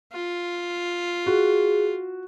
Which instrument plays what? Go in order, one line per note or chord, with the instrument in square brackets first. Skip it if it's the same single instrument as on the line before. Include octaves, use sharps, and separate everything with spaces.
[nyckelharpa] F4
[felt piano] F#4 [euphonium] G#4